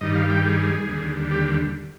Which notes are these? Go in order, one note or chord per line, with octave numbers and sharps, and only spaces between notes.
G2 D#3 G3 D#5
F5
G5
G#4
D#2 D3 G3
G4